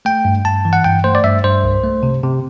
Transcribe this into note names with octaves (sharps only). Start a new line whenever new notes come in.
A3 G5
G2
G2 A5
E3
F#5
G2 G5
A3 C5
D5
G2 E5
G2 C5
C2
A3
C3
C3